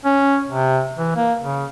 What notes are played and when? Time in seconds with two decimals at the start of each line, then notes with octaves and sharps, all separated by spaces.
0.05 C#4
0.47 C3
0.97 E3
1.15 A#3
1.41 C#3